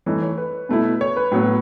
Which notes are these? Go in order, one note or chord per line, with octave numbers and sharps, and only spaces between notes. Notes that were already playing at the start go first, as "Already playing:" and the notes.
E3 A3 D#4 C#5
C#5
B4
B2 A3 E4
C#5
B4
A2 F#3 B3